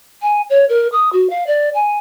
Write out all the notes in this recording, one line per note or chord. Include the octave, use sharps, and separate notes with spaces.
G#5
C#5
A#4
D#6
F#4
F5
D5
G#5